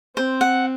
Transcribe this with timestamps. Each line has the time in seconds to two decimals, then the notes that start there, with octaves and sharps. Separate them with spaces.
0.16 C4 C5
0.41 F#5